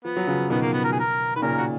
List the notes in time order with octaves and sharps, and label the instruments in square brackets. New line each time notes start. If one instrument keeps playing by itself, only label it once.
[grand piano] F3 [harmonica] B3
[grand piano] F#3
C#3 F3
[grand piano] B2 D#3 [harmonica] B3
[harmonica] A#3
B3
A#4
G#4
A#4
[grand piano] D#3 [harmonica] B4
[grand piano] A#2 C#3 [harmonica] A#4
[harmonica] F#4